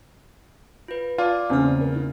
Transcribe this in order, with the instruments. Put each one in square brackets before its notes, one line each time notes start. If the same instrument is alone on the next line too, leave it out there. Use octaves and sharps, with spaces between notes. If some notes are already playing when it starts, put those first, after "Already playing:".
[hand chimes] F4 B4
[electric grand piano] F4 [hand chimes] D5 A5 D6
[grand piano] E2 C#3 [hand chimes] A#3 F6 [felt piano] C4 C#4 D5
[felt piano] A#4
E4